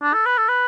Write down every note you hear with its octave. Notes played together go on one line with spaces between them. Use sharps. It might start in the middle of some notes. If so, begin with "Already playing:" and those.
D4
A4
B4
A4
B4